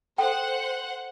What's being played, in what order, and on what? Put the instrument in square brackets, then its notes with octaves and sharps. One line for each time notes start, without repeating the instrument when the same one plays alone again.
[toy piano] A4 G5 [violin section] C5 F#5